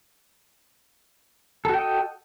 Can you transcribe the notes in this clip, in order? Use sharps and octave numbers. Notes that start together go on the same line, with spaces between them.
F#4 A4 D#5 G5